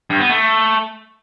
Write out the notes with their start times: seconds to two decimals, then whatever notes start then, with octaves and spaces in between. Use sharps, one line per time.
0.10 G2
0.20 B3
0.29 A3